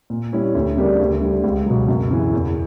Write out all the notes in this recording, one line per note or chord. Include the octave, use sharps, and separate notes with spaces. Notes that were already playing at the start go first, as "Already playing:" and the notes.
A#2
G3 C#4 E4
D2
C#3 G3 A#3 D4
D2
D3 G3
C#2
B2 F#3
F#2
C#3 E3
E2